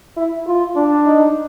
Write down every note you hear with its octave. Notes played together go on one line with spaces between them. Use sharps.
E4
F4
D4
D#4